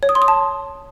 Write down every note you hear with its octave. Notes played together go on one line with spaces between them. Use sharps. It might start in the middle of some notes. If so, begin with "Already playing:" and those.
C#5
D#6
C6
D#6
A5